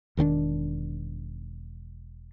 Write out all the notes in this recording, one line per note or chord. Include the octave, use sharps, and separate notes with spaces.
E1 D#3 C4 D4